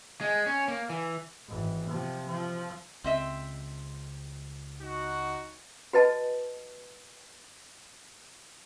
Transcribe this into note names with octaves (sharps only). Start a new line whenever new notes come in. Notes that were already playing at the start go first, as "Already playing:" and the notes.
G#3
C#4
A#3
E3
G#1 E3
C3 F3
F3
C#2 C4 D#5 E5
D#4 F#4
F#4 B4 D#5 A5